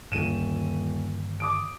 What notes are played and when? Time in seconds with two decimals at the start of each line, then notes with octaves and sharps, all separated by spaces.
0.12 D#1 G2 D3 D#3 D#7 E7
1.40 D6 D#6 D7